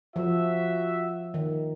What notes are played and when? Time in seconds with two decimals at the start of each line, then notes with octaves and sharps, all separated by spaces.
0.16 F3 F#4 E5
1.34 D#3